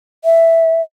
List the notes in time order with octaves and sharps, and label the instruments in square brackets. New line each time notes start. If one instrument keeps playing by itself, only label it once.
[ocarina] E5